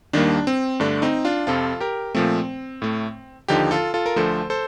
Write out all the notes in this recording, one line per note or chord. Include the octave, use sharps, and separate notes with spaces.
D#2 D#3 G3 A#3 D4
C4
G2 D3 A3 D4
C4 D#4
D4 F4
F2 C3 F3 F4 A4
G4 A#4
A#2 F3 A3 C4
A2 A3
D#2 D3 F3 D#4 G4
F4 A4
F4 A4
A#4
D2 D3 F3 A3 A4 C5
A4 C5